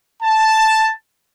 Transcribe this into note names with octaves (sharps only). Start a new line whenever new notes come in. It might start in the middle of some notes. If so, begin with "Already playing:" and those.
A5